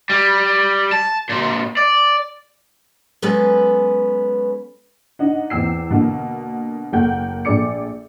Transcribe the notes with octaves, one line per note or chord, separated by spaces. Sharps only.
G3
A5
A#2 C4
D5
F#3 G#3 B3 C#4 A4 B4
D4 D#4 D#5 F#5
E2 C4 G5 E6 C7
B2 D3 A#3
F#1 A3 A#3 F#5 G5 G6
A#1 A3 G#4 D5 D6 C#7